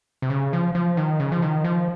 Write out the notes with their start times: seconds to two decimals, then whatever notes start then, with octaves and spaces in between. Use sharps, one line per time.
0.22 C3
0.30 C#3
0.53 F3
0.75 F3
0.97 D#3
1.20 C#3
1.32 F3
1.42 D#3
1.64 F3